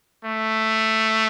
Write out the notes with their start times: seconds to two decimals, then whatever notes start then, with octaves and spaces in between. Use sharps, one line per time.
0.25 A3